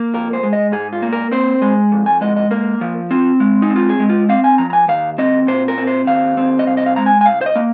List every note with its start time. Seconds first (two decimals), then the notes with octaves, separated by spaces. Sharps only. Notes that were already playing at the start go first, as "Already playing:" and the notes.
Already playing: A#3
0.13 F2 A#4
0.33 C5
0.43 G#3
0.53 D#5
0.72 G#2 G#4
0.93 F4
1.02 A#3
1.13 A#4
1.31 C4 C5
1.62 G#3
1.92 F2
2.06 G#5
2.21 G#3 D#5
2.36 D#5
2.51 A#3 A#4
2.81 F3
3.11 C4 F4
3.40 G#3
3.62 D#4
3.70 C4
3.76 F4
3.89 G#4
3.99 G#3
4.09 F4
4.29 C4 F5
4.44 G#5
4.58 F3 A#5
4.70 A#5
4.73 G#5
4.88 D#2 F5
5.18 C4 D#5
5.48 A#2 C5
5.68 A#4
5.78 C4
5.87 C5
6.07 D#2 F5
6.37 C4
6.59 D#5
6.67 C2 F5
6.77 D#5
6.86 F5
6.96 G#3 A#5
7.06 G#5
7.21 G#5
7.26 C2 F5
7.41 C5
7.46 D#5
7.56 A#3